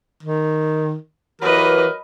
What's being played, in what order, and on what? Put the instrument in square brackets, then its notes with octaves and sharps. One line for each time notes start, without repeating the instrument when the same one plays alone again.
[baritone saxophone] D#3
[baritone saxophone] E3 [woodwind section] F#3 G4 A#4 [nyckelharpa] B4 D#5